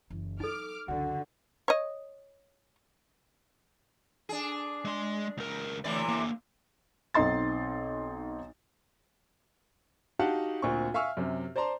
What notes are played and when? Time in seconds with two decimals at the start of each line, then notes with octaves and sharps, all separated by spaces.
0.10 F#1 E3
0.40 F#3 D#4 A4 D6 F6
0.88 C#2 F#2 D3 F#4
1.68 C#5 D#5
4.29 D4 G#4
4.85 G#3 C6
5.38 C#2 A#4
5.84 A2 C3 E3 A3 D5
6.08 D3 A#3
7.14 B1 C4 D#4 D#5 C6 A6
10.19 D#4 F#4 G4 F5 F#5 A5
10.62 D2 A#2 C4 C#6
10.94 E5 F5 G#5 C#6 E6 F6
11.17 F#2 C3
11.56 C5 D5 A5 A#5 C6